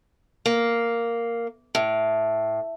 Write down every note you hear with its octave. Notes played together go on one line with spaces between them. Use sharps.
A#3
A2